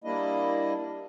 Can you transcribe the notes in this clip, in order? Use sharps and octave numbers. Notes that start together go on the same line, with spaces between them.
G3 A#3 D4 E4 D#5